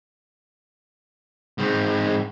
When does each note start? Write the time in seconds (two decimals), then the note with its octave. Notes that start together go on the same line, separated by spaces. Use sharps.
1.58 G#2 C4